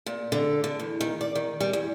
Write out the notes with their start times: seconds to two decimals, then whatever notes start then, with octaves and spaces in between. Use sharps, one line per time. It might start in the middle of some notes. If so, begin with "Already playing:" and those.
0.06 A#2
0.32 D3
0.64 D3
0.80 E2
1.01 D#3
1.21 D5
1.35 D#3
1.60 G3
1.73 E2